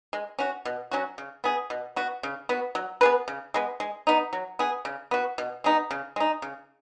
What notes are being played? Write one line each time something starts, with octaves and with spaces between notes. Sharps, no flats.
G#3
C#4 F#4
B2
F#3 C#4 F#4
C#3
B3 G#4
B2
B3 F#4
C#3
B3 F#4
F#3
B3 G#4 B4
C#3
G#3 B3
G#3
B3 D#4
F#3
B3 G#4
C#3
B3 F#4
B2
G#3 B3 D#4
C#3
G#3 D#4
C#3